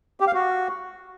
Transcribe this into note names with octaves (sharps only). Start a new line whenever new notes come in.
G4
F5
F#4